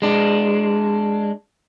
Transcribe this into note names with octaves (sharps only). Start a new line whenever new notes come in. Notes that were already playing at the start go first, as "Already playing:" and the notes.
G#3 D4